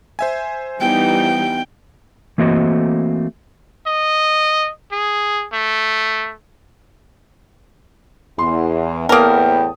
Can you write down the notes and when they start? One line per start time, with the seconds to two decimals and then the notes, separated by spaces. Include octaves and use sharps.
0.19 C5 E5 G#5
0.80 E3 G3 B3 D#4 G5
2.38 E3 A3 A#3 C4 F#4 D#5
3.87 D#5
4.92 G#4
5.53 A3
8.39 E2 C6
9.09 E2 A2 A#3 B3 A#4 G5 A5 D#6